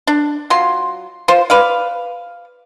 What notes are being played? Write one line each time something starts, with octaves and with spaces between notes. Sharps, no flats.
D4
F#3 F4 C6
F4 C5
B4 D5 F5